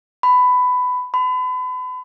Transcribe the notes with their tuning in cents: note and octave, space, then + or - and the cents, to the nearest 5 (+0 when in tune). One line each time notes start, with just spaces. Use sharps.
B5 +15
B5 +35